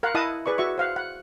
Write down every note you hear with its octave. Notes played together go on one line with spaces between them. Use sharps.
A#4 F5 F#5
E4 D#5 F#5 A5 D#6
G#4 B4 D5 C#6
F#4 E5 C#6
C5 F5 F#5
F#5